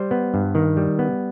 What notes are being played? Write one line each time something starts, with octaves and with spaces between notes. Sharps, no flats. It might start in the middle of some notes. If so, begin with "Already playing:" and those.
Already playing: G3 C5
B3
G2
D#3
G3
B3